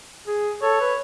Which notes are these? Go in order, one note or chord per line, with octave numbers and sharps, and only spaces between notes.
G#4
A4 C#5
B4